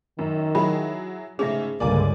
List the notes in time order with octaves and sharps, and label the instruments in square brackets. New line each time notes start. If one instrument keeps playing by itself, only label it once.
[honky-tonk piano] F#2 [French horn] D#3
[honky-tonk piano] F#3 E4 G#4 [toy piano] B5
[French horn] G#2 [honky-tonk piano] C#3 A3 C#4 [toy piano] G#4 E5
[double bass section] C#2 G2 D3 [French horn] A#3 [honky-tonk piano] D5 G#5 D6